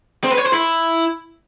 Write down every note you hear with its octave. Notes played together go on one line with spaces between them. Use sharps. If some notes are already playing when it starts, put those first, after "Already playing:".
C4
B4
C#5
C5
E4